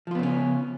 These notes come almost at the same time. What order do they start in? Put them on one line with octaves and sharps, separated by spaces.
F3 F4 B3 C#3 C#4